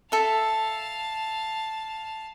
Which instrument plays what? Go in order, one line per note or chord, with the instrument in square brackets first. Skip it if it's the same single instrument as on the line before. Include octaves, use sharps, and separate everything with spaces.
[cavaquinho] A4 E5 [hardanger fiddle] F5 A5